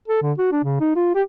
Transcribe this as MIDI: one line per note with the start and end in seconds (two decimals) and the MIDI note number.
0.08 0.21 69
0.22 0.32 50
0.38 0.49 66
0.52 0.60 62
0.64 0.78 49
0.80 0.95 63
0.96 1.13 65
1.15 1.22 67